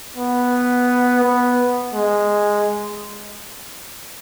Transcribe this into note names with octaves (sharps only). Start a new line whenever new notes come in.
B3
B3
G#3